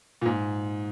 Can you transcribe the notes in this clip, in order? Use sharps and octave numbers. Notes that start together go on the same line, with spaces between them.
A#2
G#2